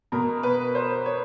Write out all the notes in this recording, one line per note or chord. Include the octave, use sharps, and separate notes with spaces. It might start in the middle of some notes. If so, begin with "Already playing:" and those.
B2 A#4
B4
C5
C#5